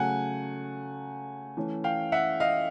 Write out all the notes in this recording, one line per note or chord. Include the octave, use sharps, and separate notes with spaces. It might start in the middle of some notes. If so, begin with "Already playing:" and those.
Already playing: C#3 F#3 A3 F#5 G#5
E3 A3 C#4
F5 G5
E5 F#5
D#5 F5